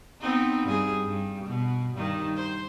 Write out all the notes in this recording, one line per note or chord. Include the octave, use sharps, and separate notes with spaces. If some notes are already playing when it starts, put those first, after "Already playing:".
B3 C4 D#4
G2 G#4
G2
B2
G2 D#3
C5